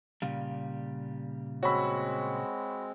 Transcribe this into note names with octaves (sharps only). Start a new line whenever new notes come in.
A#2 C#3 G3 F5
G#3 C4 F#4 C#5 B5 C#6 E6